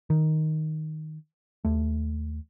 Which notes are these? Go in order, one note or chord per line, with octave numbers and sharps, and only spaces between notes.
D#3
D#2 A3